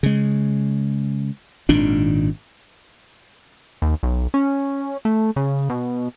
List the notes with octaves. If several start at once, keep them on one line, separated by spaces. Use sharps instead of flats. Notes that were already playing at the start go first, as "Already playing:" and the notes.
C#3 G#3
G#1 A#2 D#3 D4
D#2
B1
C#4
A3
C#3
B2